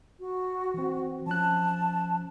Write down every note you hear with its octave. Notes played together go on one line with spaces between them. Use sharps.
F#4
E3 C4
F3 C#4 A5 F#6